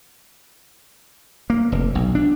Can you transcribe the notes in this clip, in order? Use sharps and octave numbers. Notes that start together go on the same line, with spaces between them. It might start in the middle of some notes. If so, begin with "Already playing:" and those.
A#3
F1
B1
D4